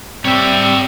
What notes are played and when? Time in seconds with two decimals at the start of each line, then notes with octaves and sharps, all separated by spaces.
0.25 G3 C4 C#5 E5